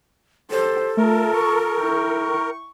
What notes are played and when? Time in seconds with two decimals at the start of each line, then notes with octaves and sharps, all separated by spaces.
0.51 G4 A4 C5
0.97 A3 F4 A#4 A5
1.33 C#6
1.79 E4 G5